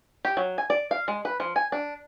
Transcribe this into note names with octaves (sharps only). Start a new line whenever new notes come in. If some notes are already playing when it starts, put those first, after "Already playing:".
G4
F#3
G#5
D5
F5
G#3
B4
F3
G#5
D4